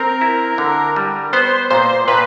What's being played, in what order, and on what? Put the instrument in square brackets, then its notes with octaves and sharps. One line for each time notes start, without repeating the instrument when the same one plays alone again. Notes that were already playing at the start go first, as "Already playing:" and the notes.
Already playing: [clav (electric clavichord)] C4 [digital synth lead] A#4
[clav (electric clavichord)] E4
D3
G3
[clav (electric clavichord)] B3 [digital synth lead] C5
[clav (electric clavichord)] A#2 [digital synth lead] C5
[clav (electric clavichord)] A#2 [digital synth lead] B4